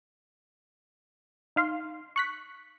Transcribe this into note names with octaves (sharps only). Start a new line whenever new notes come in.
D#4 F5 C6
C#6 F#6 B6